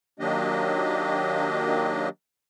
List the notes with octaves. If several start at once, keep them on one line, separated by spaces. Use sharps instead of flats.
D#3 F#3 A#3 D4 G4 D#5